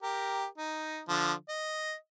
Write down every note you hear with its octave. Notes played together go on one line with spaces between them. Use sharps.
G4 A#4
D#4
D3 F3
D#5